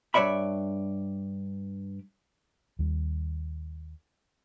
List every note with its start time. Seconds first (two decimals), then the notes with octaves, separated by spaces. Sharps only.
0.14 G2 C#5 D5 E5 B5
2.79 D#2 G3